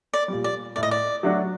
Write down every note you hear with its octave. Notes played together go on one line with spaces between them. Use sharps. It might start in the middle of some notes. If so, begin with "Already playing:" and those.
D5
A#2 G3
D5
A2 D5
D#5
D5
F#3 A3 D4 F#4